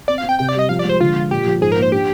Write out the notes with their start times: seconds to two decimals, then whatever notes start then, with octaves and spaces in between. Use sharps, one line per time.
0.08 C4 D5
0.18 F5
0.24 C4
0.29 G5
0.39 C3 G5
0.49 D5
0.55 G3 D#5
0.69 F3 F5
0.79 D5
0.85 G#3 C5
1.00 D3 F4
1.15 G#3
1.31 A#2 G4
1.46 F3
1.61 G#2 G#4
1.72 A#4
1.77 A#3
1.82 C5
1.92 D4 G4